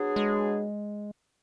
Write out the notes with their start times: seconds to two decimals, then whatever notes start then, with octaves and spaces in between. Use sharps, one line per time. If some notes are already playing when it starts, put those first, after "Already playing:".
Already playing: F#3 B3 D4 G#4
0.16 G#3